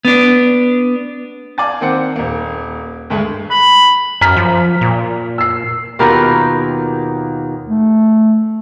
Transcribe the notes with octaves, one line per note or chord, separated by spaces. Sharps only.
B3 D4
D5 F5 G#5 A5 A6
D#3 A#3 C4 F#5 C#7
D#1 A#3
D2 G2 G#3 A3
B5
F#2 A#5 F6 B6
F3
A#2
E6 C7
D#2 B2 F4 G4 A#4 B5
A3